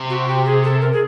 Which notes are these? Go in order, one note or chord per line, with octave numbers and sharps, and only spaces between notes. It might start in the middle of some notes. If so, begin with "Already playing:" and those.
Already playing: C3
F#4
G4
G#4
A4
A#4
G#4